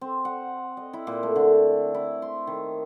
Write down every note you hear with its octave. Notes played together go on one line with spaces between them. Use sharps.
C4
F#5
D#5
E4
A#2
A3
D3
E4
C6
D#3